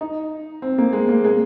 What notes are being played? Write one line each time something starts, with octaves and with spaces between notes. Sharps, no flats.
D#4
C4
A#3
G#3
A#3
G#3